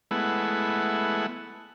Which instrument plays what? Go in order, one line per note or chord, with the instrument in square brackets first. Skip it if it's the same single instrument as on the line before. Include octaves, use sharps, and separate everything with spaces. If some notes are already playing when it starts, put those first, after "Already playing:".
[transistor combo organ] G#3 A3 B3 E4 F#5